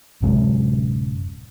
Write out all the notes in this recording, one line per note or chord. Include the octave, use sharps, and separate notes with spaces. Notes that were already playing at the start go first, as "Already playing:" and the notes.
D1 F#2 C3 G#3